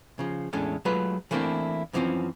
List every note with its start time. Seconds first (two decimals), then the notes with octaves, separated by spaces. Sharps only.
0.19 C#3 F3
0.53 E2 A2 G#3 A3 C#4 D4
0.85 F#3 G#3 A3 F4 B4
1.31 E3 A3 A#3 C4 D4 E4
1.93 F#2 E3 F3 G#3 C4 C#4